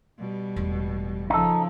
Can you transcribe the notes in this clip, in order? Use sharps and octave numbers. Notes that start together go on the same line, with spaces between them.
B2 G3
E1 A1
C#3 F3 D#4 A4